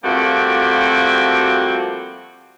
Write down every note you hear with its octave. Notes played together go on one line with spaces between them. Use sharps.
F3 G3 A3 A#3 C4 F#4